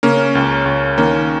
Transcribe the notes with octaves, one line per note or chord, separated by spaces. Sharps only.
C#3 A#3 C#4
C#2
C#2
D#3 A#3 C#4